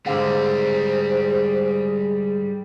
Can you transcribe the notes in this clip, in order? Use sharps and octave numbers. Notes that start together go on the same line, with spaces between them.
G#2 D3 G3 C4 G#4 C5 F5